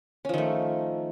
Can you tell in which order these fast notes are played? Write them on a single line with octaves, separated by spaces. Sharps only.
C#4 F3 D#3 A3